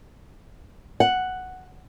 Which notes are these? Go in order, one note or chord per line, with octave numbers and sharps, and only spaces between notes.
F#5